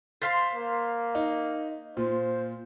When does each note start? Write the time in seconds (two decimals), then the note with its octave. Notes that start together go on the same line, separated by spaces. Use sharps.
0.22 C5 F5 C6 A6 B6 C7
0.55 A#3
1.15 D#4
1.97 A#2 F4 C5